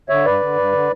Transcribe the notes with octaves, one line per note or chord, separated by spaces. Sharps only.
D3 C#5 E5
G2 B4 D5
D3
G2
D3